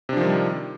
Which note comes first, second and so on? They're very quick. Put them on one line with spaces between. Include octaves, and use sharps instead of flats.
C3 D4 F3 D#3 G3